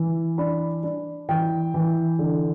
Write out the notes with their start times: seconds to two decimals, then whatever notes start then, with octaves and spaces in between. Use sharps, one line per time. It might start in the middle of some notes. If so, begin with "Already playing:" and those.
Already playing: E3
0.38 D4 B5
0.83 D4
1.29 E3 G5
1.74 E3
2.19 D3